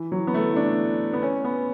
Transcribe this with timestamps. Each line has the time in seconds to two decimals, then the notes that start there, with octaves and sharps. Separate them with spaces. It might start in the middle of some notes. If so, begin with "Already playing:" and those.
Already playing: E3
0.12 F#3
0.27 B3
0.34 A3
0.52 E4
0.56 D4
1.13 B3
1.22 C#4
1.44 B3